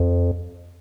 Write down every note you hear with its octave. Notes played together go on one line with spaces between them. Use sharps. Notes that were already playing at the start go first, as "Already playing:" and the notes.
Already playing: F2